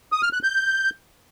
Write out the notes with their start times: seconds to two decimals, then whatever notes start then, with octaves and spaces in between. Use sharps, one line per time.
0.12 D#6
0.23 F6
0.33 F#6
0.43 G6